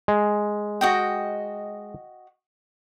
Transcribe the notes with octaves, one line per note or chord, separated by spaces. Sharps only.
G#3
F#4 D#5 G5